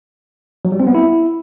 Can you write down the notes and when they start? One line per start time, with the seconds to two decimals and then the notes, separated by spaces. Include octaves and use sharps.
0.65 F#3
0.72 G3
0.80 C4
0.87 B3
0.95 E4